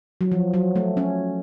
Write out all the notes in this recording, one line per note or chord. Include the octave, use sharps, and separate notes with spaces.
F#3
F3
F#3
A3
C#4